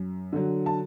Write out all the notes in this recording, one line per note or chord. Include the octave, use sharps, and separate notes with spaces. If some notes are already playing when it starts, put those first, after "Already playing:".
Already playing: F#2
D3 F#3
A5